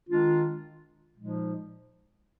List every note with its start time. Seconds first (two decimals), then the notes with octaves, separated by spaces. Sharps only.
0.08 D#3 G#3 D4 F4
1.16 A#2 F3 G#3 D#4